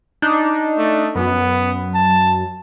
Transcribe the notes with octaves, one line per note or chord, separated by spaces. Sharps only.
D4 D#4
A3
F#2 B3
A5